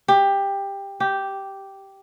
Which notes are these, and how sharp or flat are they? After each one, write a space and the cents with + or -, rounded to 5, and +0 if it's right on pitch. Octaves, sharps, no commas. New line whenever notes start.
G4 +15
G4 -5